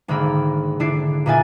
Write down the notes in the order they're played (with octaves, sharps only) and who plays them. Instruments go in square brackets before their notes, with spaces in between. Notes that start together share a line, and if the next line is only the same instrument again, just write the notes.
[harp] G#1 D3 A#3 B5 E6
D3 E4 D5 C7
A#2 A#3 B3 E5 G#5 A6